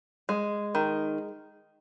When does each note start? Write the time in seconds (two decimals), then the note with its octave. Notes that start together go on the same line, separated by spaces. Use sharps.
0.29 G#3
0.75 D#3